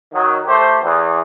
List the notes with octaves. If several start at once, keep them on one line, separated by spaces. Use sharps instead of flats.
D#3 F#3
A3 G4 C5
E2